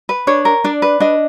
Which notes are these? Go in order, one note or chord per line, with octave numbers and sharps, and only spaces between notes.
B4
D4 C#5
A#4
D4 D5
B4
D4 D#5